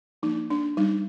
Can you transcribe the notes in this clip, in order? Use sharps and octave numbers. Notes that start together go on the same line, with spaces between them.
F3 A#3 D4 D#4
D4
G3 D4 D#4